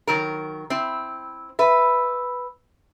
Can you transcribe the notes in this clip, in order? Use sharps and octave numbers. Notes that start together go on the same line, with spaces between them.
D#3 F#3 A#4
C4 E4
B4 E5